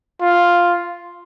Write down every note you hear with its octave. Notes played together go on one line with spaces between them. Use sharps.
F4